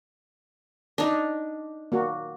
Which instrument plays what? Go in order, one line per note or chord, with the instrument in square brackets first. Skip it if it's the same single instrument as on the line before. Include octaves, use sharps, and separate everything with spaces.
[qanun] D4 D#4
[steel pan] A#3 F#4